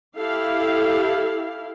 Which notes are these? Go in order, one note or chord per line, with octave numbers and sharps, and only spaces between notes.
E4 G4 A4 F5